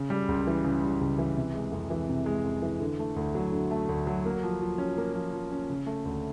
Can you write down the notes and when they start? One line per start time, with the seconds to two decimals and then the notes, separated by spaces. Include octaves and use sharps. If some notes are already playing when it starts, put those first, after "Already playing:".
Already playing: C#3
0.10 G3
0.28 C#2
0.47 E3
0.65 C#3
0.82 G3
1.01 C#2
1.18 E3
1.37 C3
1.55 G#3
1.72 F2
1.90 E3
2.09 C3
2.26 G#3
2.44 F2
2.62 E3
2.80 D3
2.99 A3
3.16 D2
3.35 F#3
3.52 D3
3.71 A3
3.89 D2
4.07 F#3
4.25 A#3
4.43 F3
4.61 F3
4.78 C#4
4.98 A#3
5.15 F3
5.33 F3
5.52 C#4
5.69 C#3
5.86 A3
6.05 D2